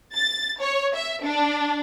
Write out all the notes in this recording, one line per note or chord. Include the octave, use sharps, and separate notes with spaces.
A6
C#5
E5
D4